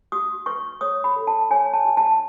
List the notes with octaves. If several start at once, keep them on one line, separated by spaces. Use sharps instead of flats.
F#4 D#6
B4 C#6
C#5 D#6
B5
A4
A5
C#5 G#5
A5
F#4
A5